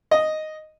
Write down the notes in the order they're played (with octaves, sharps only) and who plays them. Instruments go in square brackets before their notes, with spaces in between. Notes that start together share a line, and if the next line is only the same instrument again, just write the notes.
[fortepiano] D#5